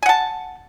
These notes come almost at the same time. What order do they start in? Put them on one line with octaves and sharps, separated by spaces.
G#5 F#5 A5